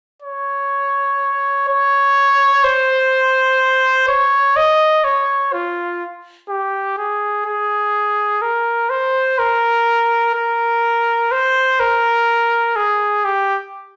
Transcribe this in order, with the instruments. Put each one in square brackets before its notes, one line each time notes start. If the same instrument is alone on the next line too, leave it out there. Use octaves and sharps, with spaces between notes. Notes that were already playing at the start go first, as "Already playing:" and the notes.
[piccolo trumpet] C#5
C#5
C5
C#5
D#5
C#5
F4
G4
G#4
G#4
A#4
C5
A#4
A#4
C5
A#4
G#4
G4